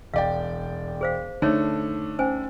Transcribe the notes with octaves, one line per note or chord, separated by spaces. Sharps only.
E1 D5 F5 G5
G#4 C5 F5
D3 A3 D#4 C#5
C#4 C5 G#5